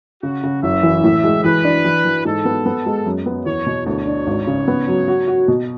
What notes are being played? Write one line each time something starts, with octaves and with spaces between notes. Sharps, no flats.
C#3 F#4
C#3
F#1 E5
E3
A2
G#3
E3 B4
D4
E3
E3
G#2 A4
B3
B3
G#3
F#2
B3
E2 C#5
B2
D2 C#5
D4
G#1
C#3
B3
F#3
F#4
F#4
B2